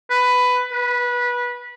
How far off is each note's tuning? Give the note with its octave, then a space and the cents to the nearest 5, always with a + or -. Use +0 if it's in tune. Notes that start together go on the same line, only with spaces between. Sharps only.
B4 +10
B4 -20